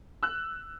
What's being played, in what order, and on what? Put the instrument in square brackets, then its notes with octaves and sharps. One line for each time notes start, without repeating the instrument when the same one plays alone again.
[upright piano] E6 F#6